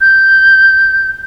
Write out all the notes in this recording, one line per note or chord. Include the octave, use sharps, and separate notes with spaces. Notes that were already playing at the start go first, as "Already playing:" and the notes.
G6